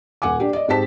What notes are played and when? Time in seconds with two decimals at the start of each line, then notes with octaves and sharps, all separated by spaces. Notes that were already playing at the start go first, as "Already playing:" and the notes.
0.22 D#1 F#5 G#5 D6
0.40 D4 G4
0.53 D5 D#5
0.68 G#2 G#3 C4 G4 A5 B6